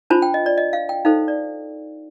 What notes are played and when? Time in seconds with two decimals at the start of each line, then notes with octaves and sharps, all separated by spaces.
0.10 D4 F4 C5 A5
0.22 G5
0.34 D#5
0.46 D5
0.58 D#5
0.73 F5
0.89 G5
1.05 D#4 A4 C5 F5
1.28 D5